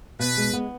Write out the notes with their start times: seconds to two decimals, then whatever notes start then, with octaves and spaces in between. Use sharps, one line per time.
0.19 B2 B4
0.37 G#3
0.53 B3